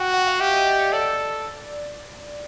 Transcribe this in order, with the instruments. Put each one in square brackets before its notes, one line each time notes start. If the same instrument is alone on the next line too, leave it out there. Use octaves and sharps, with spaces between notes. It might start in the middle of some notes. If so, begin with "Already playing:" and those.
Already playing: [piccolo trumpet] F#4 [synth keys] G5
[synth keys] F#5
F5
[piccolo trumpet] G4 [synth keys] E5
[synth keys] D#5
D5
C#5
[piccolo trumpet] A4 [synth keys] D5